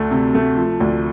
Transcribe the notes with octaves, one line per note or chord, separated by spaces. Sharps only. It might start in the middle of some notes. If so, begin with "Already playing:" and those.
Already playing: D2 A3
C3
A3
F3
D2